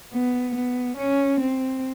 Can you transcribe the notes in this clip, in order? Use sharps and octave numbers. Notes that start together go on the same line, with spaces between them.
B3
B3
C#4
C4